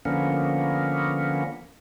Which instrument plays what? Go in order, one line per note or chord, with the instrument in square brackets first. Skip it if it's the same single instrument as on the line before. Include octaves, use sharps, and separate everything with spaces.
[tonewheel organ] D3 F3 A#3 B3 C#4